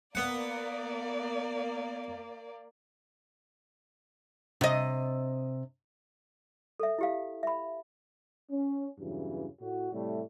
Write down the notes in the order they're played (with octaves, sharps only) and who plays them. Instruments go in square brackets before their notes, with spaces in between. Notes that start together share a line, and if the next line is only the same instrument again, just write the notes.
[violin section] A#3 D5 [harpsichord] B3 F#5
[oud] C3 D#5
[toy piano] A4 E5
E4 G4 F5
E5 B5
[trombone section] C#4
E2 G2 C#3 E3 F#3
A2 F#4
A2 C3 G3 A3